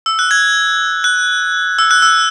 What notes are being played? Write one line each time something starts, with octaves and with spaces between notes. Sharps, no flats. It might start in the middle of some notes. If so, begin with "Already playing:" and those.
E6
F#6
G#6
F#6
E6
F#6
E6